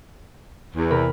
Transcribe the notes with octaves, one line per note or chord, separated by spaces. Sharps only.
E2
C3 A#4 B5